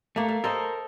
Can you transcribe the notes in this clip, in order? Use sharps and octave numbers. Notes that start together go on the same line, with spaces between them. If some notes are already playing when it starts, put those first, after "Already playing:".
A3 A#3 F5
F5
A4 A#4 C5 D#5